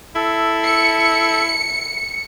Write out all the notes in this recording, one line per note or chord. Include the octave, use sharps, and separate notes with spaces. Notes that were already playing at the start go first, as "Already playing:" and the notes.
E4 A4
C#7